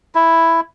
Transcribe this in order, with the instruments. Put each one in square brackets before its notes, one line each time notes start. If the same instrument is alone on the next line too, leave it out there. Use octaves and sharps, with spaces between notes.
[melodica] E4